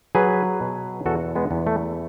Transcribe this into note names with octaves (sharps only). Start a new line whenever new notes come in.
F#3 G#4 B4
B2
E2 F#4 A4
G#3 B3
E2
A3